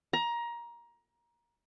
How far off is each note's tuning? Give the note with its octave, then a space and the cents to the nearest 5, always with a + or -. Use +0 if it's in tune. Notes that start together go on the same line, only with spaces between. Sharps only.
A#5 +20